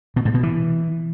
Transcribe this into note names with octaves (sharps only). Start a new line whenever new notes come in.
B2
G#2
B2
E3